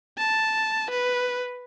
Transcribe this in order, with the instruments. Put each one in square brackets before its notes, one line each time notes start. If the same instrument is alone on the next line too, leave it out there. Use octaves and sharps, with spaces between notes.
[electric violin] A5
B4